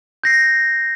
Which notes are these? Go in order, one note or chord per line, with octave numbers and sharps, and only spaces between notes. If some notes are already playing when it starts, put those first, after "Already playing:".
G6 A#6 C7